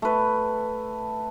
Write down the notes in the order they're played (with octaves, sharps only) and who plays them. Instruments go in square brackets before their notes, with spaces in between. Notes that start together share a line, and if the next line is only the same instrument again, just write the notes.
[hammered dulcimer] A3 B4